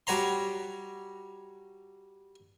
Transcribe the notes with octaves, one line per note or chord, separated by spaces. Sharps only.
G3 F#4 C#5 A#5 C6